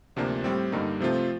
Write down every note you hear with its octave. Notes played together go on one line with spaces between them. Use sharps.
D2 C3 F3 A#3 D4
A2 G3 C4
G2 D3 G3 A#3 D#4
C3 F3 A3 C4 F4